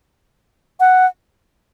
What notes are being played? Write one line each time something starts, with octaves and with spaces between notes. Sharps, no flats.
F#5